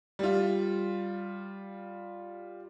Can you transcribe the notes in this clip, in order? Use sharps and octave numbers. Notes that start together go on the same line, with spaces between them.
G3 F4